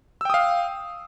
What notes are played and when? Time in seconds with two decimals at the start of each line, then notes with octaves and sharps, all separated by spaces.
0.21 E6
0.25 G5
0.30 D#6
0.34 F5